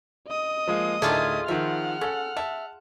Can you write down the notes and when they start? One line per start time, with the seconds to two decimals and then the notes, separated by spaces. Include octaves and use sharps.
0.27 D#5 D#6
0.67 F3 G#3 A#3
1.02 D2 A2 D#3 A3 D4 F4 G#4
1.48 D#3 F3 E5 F#5 F6
2.01 C#4 A4
2.37 E5 A5